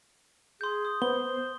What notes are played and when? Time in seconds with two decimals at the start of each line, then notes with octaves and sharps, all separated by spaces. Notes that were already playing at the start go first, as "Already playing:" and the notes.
0.61 G#4 C6 G6
0.85 D#6
1.02 B3 C5 G7